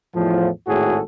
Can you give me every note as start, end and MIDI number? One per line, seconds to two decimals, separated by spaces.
0.15 0.48 40
0.15 0.48 45
0.15 0.48 53
0.67 0.99 32
0.67 0.99 45
0.67 0.99 66
0.67 0.99 68
0.67 0.99 69